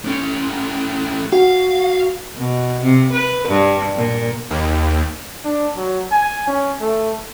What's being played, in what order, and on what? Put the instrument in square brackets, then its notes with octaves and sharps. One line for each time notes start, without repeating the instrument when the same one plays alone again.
[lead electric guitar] A2 C#4
[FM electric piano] F#4 [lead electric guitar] F5
[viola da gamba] B2
C3
B4
G2
A#2
[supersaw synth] D#2
[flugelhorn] D4
F#3
G#5
C#4
A3